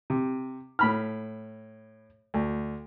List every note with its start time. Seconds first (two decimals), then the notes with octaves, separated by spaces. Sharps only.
0.10 C3
0.79 A2 B5 F6
2.34 D2